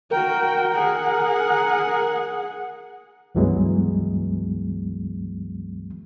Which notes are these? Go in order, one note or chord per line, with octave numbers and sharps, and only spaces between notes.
F#4 A#4 G5
G#4 F#5
C#2 G2 E3 F#3 G#3 B3